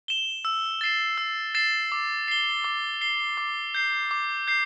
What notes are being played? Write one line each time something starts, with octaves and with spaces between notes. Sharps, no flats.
E7 G7
E6
A6 C7 E7
E6
A6 C7 E7
D6
C7 G7
D6
C7 G7
D6
G6 C7
D6
G6 C7